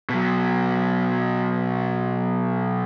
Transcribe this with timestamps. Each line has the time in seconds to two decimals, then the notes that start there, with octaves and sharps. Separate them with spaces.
0.10 B2 F#3